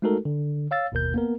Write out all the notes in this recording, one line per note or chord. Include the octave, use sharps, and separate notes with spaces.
G#3 A3 D#4 F#4 A4 A#4
D3
C#5 F5 E6 A6
G1 D#2 B2 A#4 G6
A#3 B3 A#4